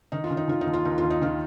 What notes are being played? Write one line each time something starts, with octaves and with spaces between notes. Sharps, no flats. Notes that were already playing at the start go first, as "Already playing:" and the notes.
D#3 D#4
F4
D#3
D#4
D#3 F4
D#4
D#2
F4
D#2 D#4
F4
D#2
D#4
D#3 F4